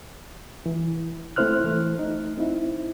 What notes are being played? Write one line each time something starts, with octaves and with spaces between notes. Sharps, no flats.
E3
A3 C4 E4 C5 F6 F#6
E3 A3
D#4
C4 D#4 E4